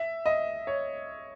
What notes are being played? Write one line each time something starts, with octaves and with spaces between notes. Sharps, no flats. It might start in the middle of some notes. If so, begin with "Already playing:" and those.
Already playing: E5
D#5
C#5